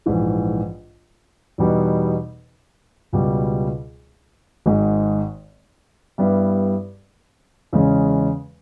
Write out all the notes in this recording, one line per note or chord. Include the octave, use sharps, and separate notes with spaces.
A#1 G#2 E3
E2 B2 G3 B3 D#4
C#2 B2 G3
G#1 G#2 D#3 G#3
G2 G3 B3 E4
E2 C#3 G#3 C#4